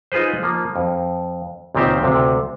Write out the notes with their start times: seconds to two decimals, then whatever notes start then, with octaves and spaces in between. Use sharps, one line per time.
0.12 D#4 F4 G#4 B4 C5
0.43 F3 A#3
0.76 F2
1.75 C#2 A#2 D#3 C4 G4 C5
2.03 D2 C3